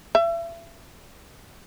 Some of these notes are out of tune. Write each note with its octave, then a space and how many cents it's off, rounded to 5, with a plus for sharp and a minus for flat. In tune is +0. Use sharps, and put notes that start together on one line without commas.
E5 +35